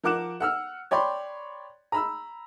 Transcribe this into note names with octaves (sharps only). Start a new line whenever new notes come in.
F3 A#4 F#5 D6 F#6 E7
F#5 E6 F6
C#5 D5 G5 B5 C6
A#5 B5 E6